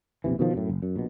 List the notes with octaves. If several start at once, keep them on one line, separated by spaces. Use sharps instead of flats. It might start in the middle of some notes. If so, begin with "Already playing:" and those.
A#1 E2 C3 E3
B2 D#3 F3
F#2 A2
F#1
F#2
A#1 B2